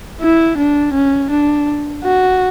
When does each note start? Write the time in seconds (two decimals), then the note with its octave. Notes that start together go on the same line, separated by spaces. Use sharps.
0.21 E4
0.58 D4
0.94 C#4
1.31 D4
2.04 F#4